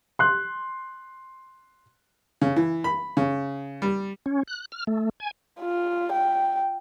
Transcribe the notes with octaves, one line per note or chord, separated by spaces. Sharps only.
C6 F#6
C#3
E3
B5
C#3
G3
C#4
F#6
F6
A3
G#5
F4
G5